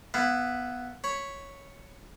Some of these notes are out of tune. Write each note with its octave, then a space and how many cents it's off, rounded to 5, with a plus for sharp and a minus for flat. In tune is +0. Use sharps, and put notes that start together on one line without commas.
B3 +0 E4 +0 F5 -25
C#5 +0 B5 +0